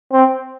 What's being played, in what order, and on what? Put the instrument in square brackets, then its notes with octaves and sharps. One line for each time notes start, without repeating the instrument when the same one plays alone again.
[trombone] C4